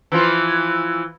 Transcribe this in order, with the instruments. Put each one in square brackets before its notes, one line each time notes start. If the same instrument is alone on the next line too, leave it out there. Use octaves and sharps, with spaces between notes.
[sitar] E3 F3 F4